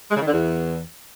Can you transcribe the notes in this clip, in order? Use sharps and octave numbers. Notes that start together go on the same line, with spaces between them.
G#3
C#3
D#3
D3
E2